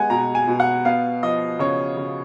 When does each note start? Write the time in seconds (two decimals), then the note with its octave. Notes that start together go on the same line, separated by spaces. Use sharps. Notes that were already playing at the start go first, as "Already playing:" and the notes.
Already playing: G#3 B3 F#5 G#5
0.10 B2 A#5
0.35 G#5
0.47 B2
0.60 F#5
0.85 B3 F5
1.23 F3 D#5
1.59 C#3 C#5
1.97 C#3